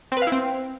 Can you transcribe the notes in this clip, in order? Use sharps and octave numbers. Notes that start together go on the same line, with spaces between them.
C4
B4
F5
E4
C4